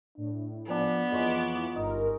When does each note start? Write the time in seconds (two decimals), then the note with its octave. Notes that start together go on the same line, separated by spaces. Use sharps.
0.18 A2 D4
0.68 F3 B3 D4 G#5
1.12 F2 E3 G#3 F4 C#5 D6
1.76 G1 G2 D#4 A#4